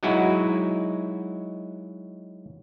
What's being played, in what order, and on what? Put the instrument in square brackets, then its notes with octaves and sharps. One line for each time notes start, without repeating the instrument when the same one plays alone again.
[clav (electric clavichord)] F#3 G#3 D#4 E4 F#4